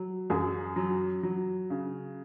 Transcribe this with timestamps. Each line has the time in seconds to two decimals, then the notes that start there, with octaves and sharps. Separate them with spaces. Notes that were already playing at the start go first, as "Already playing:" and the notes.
Already playing: F#3
0.30 F#2 G#4
0.76 F#3
1.23 F#3
1.70 C#3